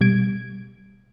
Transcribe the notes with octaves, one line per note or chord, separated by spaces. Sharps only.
B2 G3 G#6 D7